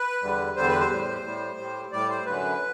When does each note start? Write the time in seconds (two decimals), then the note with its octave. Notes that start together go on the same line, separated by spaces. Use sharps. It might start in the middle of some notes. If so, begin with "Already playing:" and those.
Already playing: B4
0.22 E2 D3 G3
0.56 E2 D3 G3 C5
0.68 B4
0.79 C5
0.90 A2 G3
1.24 A2 G3
1.59 A2 G3
1.92 A2 G3 D5
2.09 C5
2.26 F#2 D3 F#3 B4